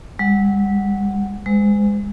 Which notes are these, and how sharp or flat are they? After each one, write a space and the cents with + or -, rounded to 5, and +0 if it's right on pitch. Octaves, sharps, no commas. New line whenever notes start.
G3 +40 F#5 +0
G#3 -15 C5 -45